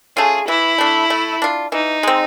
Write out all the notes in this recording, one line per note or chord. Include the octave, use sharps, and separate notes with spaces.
A3 C#4 F4 G#4
E3 E4
A3 D4
A3
D4 F4
E3 D#4
G#3 C4